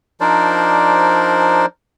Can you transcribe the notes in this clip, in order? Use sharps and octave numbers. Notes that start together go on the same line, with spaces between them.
F3 D4 D#4 A#4 C5 D5